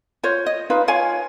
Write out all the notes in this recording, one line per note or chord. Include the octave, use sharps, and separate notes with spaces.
F4 C5 C#5
D#5
D#4 F4 B4
F4 C#5 F5 G#5